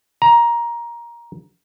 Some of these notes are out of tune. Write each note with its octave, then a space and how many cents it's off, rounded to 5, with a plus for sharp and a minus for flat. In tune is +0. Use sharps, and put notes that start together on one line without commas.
A#5 +15